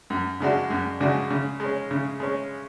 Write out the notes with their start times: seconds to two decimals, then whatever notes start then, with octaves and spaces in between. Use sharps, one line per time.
0.10 F#2
0.41 C#3 G#3 D4 F#4
0.70 F#2
1.00 C#3 G#3 D4 F#4
1.31 C#3
1.60 G#3 C#4
1.91 C#3
2.20 G#3 C#4